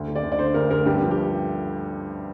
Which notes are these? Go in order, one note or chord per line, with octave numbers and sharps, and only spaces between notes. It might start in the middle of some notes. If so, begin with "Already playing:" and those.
Already playing: D2
D3
D5
D2
D5
D3 C5
D2 A#4
D2 A#4
G2 G4
F3
G4